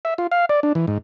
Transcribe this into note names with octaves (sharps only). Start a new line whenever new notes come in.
E5
F4
F5
D5
D4
E3
G#2